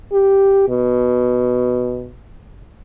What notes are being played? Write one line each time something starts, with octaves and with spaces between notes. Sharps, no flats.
G4
B2